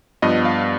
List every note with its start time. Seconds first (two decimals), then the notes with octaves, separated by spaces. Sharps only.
0.22 G2 F3 B3 D#5
0.45 F5